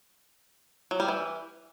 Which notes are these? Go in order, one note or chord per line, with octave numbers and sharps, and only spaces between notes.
F#3
G3
E3